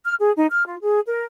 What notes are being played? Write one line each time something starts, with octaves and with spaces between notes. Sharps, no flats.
F6
G#4
D#4
F6
F4
G#4
A#4